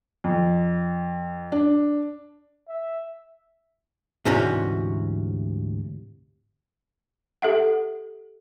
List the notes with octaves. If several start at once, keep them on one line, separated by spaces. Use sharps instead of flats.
F2
D4
E5
D2 G#2 C3 E3 C#4 F#4
G4 A4 E5 F#5